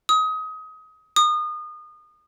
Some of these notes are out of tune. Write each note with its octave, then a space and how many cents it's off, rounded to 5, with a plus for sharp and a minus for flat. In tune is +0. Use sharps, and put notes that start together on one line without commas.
D#6 +25
D#6 -30